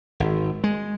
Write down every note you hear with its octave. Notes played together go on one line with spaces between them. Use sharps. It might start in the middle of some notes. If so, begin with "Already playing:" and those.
G#1
G#3